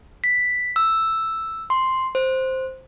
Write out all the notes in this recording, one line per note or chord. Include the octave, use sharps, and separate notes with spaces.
B6
E6
C6
C5